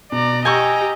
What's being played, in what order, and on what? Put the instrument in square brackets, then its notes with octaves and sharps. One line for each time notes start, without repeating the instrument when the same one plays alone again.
[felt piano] B2 [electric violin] D5 A#5
[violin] G4 [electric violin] D#5 A#5 [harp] G#5 C#6 [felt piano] E6 G6